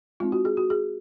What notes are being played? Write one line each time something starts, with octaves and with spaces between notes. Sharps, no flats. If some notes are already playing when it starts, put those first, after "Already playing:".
G#3 C4 D#4 F4
F#4
G#4
F#4
G#4